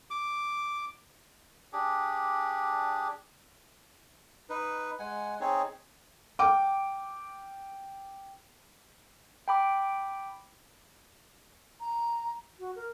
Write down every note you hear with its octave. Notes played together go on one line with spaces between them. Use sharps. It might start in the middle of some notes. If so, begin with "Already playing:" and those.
D6
D4 G4 G#4
D#4 B4
G#3 F#5 G#5
C4 D#4 G#4 C#5
G5 D6
G5 B5 D6
A#5
F#4
A#4